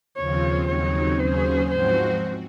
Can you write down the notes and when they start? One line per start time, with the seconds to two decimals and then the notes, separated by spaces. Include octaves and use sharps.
0.17 D#2 C#3 F3 C4 F4 C#5
0.68 D#2 C#3 F#3 C4 D#4 C#5
1.19 D#2 C#3 F#3 C#4 G#4 C5
1.71 G#2 F3 C4 F#4 C5